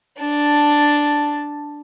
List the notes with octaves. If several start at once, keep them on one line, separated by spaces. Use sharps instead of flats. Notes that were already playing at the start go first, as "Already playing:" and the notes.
D4 A5